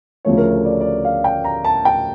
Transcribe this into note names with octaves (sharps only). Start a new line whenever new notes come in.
D2 C#3 F3 A3 C#5
A#4
C#5
D5
C#5
D5
F5
G5
A#5
A5
G5